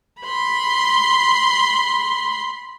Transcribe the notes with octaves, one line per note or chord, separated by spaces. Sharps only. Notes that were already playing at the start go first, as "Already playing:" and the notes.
B5 C6